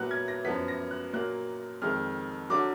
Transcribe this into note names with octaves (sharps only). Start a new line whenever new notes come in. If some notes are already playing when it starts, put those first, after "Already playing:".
Already playing: A#2 F#3 B3 F#6
G#6
A#6
F#2 F3 B3 B6
A#6
F#6
A#2 F#3 A#3 F#6
F2 D#3 G#3 F6
D3 F#3 D6